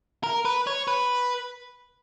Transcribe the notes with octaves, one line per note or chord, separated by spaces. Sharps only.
A#4
B4
C#5
B4